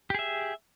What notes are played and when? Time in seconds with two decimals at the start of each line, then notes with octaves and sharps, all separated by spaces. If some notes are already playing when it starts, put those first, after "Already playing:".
0.10 G4
0.15 G#4
0.19 E5